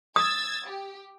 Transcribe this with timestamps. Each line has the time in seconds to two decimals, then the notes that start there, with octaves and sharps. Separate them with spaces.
0.16 D#6 E6 G#6 A6
0.66 G4